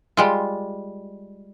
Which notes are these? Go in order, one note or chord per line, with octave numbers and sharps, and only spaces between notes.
G3 G#3 F4